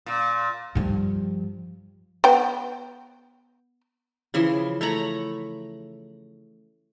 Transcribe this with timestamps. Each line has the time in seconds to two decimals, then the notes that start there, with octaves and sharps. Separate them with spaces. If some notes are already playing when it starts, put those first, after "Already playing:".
0.06 A#2
0.75 G2 F3
2.24 B3 G5
4.34 C#3 E3 F3 C6
4.81 A3 C#5 A#5 B5